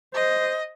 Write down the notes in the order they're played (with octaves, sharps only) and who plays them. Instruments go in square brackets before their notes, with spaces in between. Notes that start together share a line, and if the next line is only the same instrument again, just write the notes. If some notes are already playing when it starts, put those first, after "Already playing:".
[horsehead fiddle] C5 [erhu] D#5